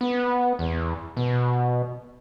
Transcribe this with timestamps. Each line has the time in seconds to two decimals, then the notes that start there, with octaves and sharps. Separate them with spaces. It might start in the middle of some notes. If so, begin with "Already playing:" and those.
0.01 B3
0.59 E2
1.17 B2